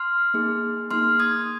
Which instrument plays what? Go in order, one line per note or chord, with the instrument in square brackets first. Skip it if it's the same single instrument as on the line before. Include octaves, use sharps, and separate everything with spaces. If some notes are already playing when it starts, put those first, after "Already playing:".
Already playing: [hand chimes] C6 F6
A#3 D#4 G#4
A#3 D#4 G#4 C6 F6
D#6 G#6